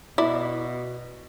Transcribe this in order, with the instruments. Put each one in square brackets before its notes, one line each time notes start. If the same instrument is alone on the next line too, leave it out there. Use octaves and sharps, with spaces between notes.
[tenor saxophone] B2 [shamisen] E4 D5